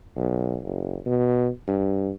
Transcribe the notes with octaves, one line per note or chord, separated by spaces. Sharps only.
B1
F#1
B2
G2